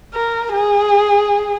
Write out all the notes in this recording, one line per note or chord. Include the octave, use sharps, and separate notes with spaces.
A#4
G#4